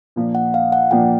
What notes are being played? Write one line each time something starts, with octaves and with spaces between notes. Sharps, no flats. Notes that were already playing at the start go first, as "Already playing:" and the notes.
A#2 F3 A#3 D4
F#5
F5
F#5
A#2 F3 A#3 D4 G5